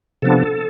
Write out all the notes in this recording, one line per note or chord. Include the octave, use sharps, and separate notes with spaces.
C3 F3 B3 D4 A4